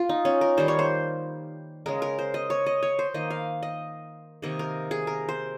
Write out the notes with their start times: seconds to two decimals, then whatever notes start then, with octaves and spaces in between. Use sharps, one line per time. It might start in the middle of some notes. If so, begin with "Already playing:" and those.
Already playing: A#3 F4
0.09 D#4
0.25 C#4
0.41 A#4
0.57 D#3 G3 A#3 C5
0.68 C#5
0.79 C5
1.86 C#3 G#3 A#4
2.02 A#4
2.19 C5
2.34 D#5
2.50 C#5
2.66 D#5
2.82 C#5
2.99 C5
3.14 D#3 A#3 D#5
3.30 F5
3.62 D#5
4.42 C3 D#3 A#3 D#5
4.59 A#4
4.91 G#4
5.07 A#4
5.29 C5